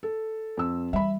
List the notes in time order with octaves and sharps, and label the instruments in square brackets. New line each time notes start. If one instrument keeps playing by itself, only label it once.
[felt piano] A4
F2 E6
[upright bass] E3 G3 [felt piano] E5 B5